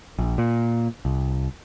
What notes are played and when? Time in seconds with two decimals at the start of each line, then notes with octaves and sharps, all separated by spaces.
0.19 A#1
0.38 A#2
1.05 C2